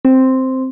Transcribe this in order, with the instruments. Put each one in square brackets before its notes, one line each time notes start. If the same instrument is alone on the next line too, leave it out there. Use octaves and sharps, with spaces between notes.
[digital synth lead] C4